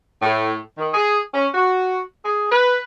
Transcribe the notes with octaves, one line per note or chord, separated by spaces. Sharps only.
A2
D#3
G#4
C#4
F#4
G#4
B4